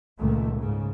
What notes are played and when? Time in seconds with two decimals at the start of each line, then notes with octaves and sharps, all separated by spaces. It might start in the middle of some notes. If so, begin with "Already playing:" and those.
0.19 C#2 A#2 D#3 A3
0.57 G#2 C#3